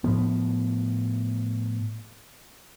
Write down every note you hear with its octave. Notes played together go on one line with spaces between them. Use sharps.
A2 F3 B3